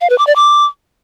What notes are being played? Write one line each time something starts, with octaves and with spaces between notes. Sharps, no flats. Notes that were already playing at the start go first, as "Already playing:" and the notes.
F5
B4
D6
D5
D6